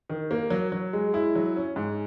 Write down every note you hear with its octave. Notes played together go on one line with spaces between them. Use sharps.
D#3
A#3
F#3
F#3
G#3
E4
F#3
C#4
G#2